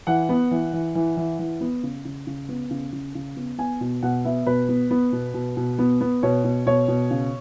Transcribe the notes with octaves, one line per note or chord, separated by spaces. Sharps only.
E3 F#5
B3
E3
E3
E3
E3
E3
B3
C#3
C#3
C#3
B3
C#3
C#3
C#3
B3
B3 G#5
B2
B2 F#5
B3 E5
B2 B4
B3
B3
B2
B2
B2
B3
B3
B2 C#5
B2
B2 C#5
B2
C#3